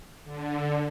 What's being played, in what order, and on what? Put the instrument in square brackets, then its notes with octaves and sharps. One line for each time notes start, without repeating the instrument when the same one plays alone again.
[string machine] D3